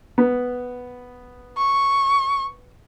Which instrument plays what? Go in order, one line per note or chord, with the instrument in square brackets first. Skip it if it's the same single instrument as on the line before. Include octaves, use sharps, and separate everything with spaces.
[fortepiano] B3
[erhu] C#6